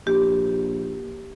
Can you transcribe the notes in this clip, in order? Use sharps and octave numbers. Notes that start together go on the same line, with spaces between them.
A#1 G4